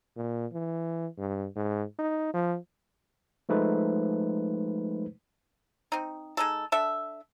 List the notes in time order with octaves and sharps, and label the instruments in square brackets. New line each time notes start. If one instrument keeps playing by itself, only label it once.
[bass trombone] A#2
E3
G2
G#2
D#4
F3
[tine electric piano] F3 G#3 A3 D#4 B4 C5
[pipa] C4 D#4
G#3 D#4 A4
D4 A4 E5